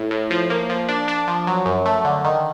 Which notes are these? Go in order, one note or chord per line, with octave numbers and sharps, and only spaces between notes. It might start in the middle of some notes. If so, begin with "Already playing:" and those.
Already playing: A2
A2
F3
A#3
F3
D4
D4
F3
F#3
F#2
A3
D3
D#3